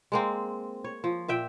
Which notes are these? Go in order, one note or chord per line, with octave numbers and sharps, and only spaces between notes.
G#3 A#3 C4
C#5
F3
A#2 E5 G5